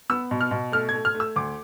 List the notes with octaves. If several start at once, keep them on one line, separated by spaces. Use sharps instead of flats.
B3 E6
B2
F6
B2
A3 F6
G#6
A3
F6
A3
E6
D2 D6